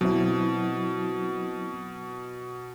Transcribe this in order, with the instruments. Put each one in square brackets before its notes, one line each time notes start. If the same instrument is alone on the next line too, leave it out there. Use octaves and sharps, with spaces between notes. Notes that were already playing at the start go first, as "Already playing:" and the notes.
[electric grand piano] B2 [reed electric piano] F#3 C4 E4